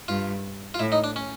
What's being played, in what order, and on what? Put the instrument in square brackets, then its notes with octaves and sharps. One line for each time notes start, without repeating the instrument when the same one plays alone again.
[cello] G2 [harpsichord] F4
[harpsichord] F4
[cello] A2 [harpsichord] E4
[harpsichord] D#4
D4
C#4